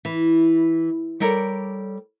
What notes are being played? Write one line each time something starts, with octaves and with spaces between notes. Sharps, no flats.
E3
G3 A4 A#4 C#5 D5